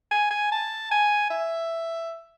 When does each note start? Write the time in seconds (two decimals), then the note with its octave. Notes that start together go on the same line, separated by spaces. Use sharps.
0.11 G#5
0.31 G#5
0.52 A5
0.91 G#5
1.30 E5